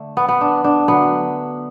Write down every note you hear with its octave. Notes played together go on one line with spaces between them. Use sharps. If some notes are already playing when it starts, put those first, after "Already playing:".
Already playing: D3 A3
B3
B3
D4
D4
D3 F#3 A3 B3